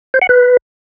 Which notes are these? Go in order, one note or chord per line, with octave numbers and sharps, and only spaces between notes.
C5
F#5
B4